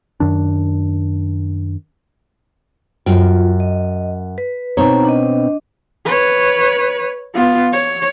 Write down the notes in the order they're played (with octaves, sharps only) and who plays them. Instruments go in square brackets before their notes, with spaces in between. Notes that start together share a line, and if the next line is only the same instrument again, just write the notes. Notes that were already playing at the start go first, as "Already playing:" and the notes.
[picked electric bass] F#2 D#3 D4
[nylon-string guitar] F#2 G5 [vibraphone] F4
[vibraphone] D#5
B4
[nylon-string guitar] B2 C4 C#5 [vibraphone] D#4 A#5
[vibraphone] D4 D#5
[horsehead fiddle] B4 C#5
B3 F4
C#5